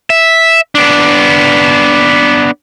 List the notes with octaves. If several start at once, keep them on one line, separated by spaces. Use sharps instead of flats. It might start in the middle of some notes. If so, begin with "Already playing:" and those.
E5
B3 D4